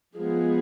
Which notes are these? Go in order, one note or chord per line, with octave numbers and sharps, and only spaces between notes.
F3 G#3 B3 G#4